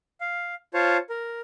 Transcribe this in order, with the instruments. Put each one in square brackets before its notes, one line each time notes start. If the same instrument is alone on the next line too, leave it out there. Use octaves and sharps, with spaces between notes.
[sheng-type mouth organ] F5
F4 C5 C#5 A5
A#4